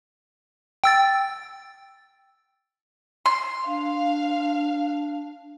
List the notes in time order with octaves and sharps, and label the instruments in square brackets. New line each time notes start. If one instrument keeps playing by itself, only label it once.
[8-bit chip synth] G5 E6 A6
[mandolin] C6
[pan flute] D4 [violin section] F5